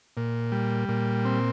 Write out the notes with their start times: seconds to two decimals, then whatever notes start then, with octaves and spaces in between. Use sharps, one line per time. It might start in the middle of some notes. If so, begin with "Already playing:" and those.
0.17 A#2
0.52 G3
0.89 A#2
1.25 C4